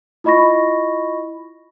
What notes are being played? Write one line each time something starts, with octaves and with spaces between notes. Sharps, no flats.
E4 F4 D#5 B5 C#6 A#6